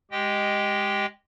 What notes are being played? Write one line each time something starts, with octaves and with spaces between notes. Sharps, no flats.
G#3 G4 D#5 G5